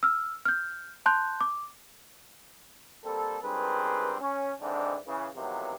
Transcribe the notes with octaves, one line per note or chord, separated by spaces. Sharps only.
E6 F6
F6 G6
A5 C6 F#6 G6
D6
G3 A#3 C4 A4
C#2 G2 C4 G#4 A#4 B4
C#4
G#2 D3 E3 C4 D4
C#3 E3
A1 C3 D#3 F3 F#3 B3